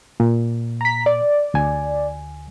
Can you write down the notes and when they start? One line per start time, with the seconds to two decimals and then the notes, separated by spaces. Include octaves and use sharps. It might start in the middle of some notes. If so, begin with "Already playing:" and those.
0.20 A#2
0.81 A#5 B6
1.06 D5
1.54 D2 G#5